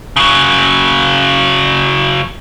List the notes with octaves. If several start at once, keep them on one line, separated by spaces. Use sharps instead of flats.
C#3 F#3